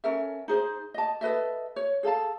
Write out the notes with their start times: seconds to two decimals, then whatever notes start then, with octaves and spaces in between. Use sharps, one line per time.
0.04 C#4 A4 A#4 E5
0.48 D#4 G#4 C5
0.94 D#5 A5
1.21 A4 B4 D#5 E5
1.76 C#5
2.03 G#4 A4 F5 A5